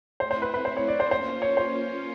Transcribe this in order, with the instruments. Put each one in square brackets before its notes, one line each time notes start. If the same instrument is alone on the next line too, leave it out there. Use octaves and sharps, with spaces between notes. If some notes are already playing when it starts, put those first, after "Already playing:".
[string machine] A3 C4 E4 [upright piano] C5
[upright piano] C5
B4
B4
C5
C#5
D5
C5
[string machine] A#3 C#4 F4 [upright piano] C5
[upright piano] C#5
C5